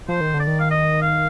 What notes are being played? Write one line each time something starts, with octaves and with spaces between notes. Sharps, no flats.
F3 C5
D#3
D3
D5
D#3
F5
D#5
F5